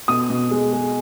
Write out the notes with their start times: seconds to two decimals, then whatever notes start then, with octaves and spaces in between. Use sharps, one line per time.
0.08 B2 D#6
0.30 B2
0.51 G#3
0.73 G#3